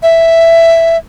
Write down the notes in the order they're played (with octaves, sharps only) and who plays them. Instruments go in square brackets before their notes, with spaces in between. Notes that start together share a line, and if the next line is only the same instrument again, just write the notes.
[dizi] E5